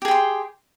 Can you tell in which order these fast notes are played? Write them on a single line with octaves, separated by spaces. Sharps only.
G4 G#4 G5 C6